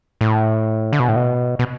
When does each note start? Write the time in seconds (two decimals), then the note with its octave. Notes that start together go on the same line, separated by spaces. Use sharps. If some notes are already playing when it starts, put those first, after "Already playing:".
0.21 A2
0.93 D3
1.00 B2
1.08 A2
1.16 B2
1.59 B2